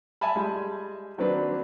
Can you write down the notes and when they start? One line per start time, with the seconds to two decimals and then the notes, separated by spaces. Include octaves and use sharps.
0.21 E5 G#5 A5 B5
0.36 G3 G#3
1.18 D#3 F#3 A#3 C4 D4 B4